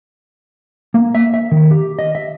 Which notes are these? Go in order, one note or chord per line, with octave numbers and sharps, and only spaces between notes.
A#3
E5
E5
D#3
G4
D#5
E5